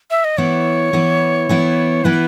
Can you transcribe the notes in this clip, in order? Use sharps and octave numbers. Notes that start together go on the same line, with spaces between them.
E5
D#5
E3 B3 E4 C#5
E3 B3 E4
E3 B3 E4
E3 B3 E4 B4